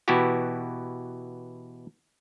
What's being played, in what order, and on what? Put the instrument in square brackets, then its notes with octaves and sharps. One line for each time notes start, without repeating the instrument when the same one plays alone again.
[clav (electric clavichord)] B2 E3 B3 E4 F#4 G4